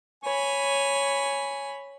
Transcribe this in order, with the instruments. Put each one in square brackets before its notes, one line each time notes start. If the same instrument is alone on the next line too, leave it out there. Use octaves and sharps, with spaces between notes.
[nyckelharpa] C#5 B5 [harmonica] G#5